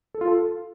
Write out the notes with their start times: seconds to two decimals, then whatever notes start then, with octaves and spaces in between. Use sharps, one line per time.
0.14 A4
0.21 F4
0.28 A4